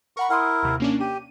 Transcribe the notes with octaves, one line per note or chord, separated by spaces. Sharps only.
A#4 F#5 B5 C#6
E4 A#4 F#5 C6 D#6
D#2 C3
A#3 C#4 D4
G4 D#7